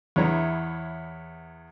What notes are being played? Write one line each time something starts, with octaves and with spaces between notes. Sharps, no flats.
E2 B3 E4 C#5 A#5